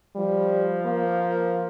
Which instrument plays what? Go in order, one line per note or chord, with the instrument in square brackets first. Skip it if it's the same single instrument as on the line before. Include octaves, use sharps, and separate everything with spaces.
[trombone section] F3 [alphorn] G3
[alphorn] A#3